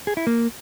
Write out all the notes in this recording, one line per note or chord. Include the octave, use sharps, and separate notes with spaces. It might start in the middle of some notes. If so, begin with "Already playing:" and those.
G#4
E4
A#3